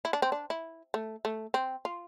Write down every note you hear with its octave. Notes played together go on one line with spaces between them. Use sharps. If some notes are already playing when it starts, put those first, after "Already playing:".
E4
D4
C4
D4
E4
A3
A3
C4
F4